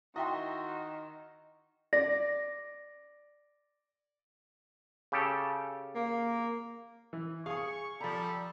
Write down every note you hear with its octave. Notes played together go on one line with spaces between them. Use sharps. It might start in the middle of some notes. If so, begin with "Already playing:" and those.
D#3 E4 F#4 D#5 E5 G5 C6
D5 A#6
C#3 G4 A4
A#3
E3
G#4 F5 G#5 C#6
F3 G3 A4 A#5 B5